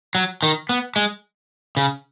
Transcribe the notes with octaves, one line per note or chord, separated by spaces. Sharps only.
F#3
D#3
B3
G#3
C#3